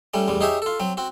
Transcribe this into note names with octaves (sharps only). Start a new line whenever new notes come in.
G3 A3 C#4
A1 E2 G3
D#4 G4 G#4 C#5 E5
F4 A4
F#3 C4
C4 F#4